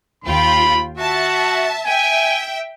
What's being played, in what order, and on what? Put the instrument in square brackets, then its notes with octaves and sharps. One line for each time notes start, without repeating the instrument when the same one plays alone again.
[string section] D#2 F4 G5 [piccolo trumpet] B5
[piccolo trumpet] F#4 [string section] E5 A5
[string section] E5 G5 [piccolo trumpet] G#5